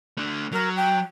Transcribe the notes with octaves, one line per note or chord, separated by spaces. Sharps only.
A3 D4
F#3 A#4
G5